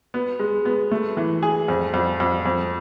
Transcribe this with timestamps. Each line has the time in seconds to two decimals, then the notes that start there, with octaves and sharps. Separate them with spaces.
0.14 B3
0.40 G#3
0.65 B3
0.91 A3
1.17 E3
1.43 G#4
1.68 F2
1.94 F2
2.20 F2
2.46 F2